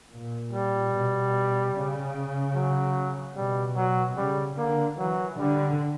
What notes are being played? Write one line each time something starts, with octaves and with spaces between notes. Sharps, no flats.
A#2
G3
B2
C#3
F#3
B2 G3
F#3
C#3 G3
D3 A#3
E3 F#3
D3 G3